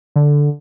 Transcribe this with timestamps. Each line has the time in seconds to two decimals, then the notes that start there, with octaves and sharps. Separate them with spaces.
0.16 D3